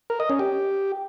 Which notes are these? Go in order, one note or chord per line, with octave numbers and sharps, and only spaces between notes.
A#4
D#5
C#4
G4